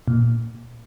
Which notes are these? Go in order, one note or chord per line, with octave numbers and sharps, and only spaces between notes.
A#2